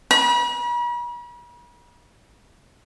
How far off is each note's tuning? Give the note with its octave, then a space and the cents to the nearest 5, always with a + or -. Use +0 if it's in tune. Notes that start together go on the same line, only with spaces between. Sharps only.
B5 -45